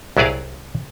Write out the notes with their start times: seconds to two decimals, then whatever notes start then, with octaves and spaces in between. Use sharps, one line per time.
0.17 C2 F#3 E4 G#4 D5 F5